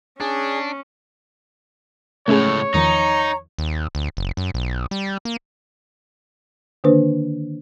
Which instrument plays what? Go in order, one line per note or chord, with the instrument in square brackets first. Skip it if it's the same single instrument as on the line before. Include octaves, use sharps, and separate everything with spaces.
[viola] C#4 [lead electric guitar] D4 [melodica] G#4
[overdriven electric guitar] C#2 A2 [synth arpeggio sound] A3 C#4 G#4 [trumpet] C#5
[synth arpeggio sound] E2 D#3 F3 [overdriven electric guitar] D#4 [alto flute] A#5
[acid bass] D#2
D2
F#1
F#2
B1
G3
A#3
[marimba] D3 D#3 A#3 D4 B4 C5